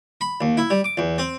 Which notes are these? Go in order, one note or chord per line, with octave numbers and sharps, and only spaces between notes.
B5
D#2
E4
G3
D6
E2
C4